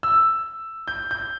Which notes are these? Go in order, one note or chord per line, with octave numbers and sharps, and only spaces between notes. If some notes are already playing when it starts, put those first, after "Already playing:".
E6
G6
G6